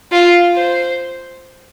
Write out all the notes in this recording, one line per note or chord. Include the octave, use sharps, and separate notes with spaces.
F4
C5